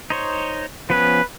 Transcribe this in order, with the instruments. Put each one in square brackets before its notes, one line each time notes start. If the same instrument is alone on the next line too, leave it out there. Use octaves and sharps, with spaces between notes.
[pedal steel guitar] D#4 C5 C#5
[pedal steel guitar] F3 B3 C#4 [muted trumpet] B4